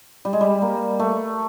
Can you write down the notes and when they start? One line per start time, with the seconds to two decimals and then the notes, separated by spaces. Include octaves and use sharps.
0.25 G3
0.33 G#3
0.41 G3
0.62 A#3
1.00 A3